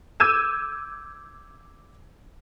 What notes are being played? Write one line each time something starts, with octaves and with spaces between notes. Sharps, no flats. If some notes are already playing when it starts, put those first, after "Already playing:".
D6 E6 G6 G#6 D#7 E7